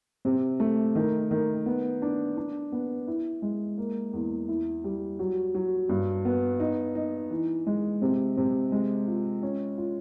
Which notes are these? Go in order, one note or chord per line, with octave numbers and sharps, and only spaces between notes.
C3
A3
D#3
D#3
B3
D4
D4
B3
E4
G#3
A#3
E2
E4
G3
F#3
F#3
G2
B3
D#4
D#4
E3
G#3
C3
C3
G#3
F4
C#4
F4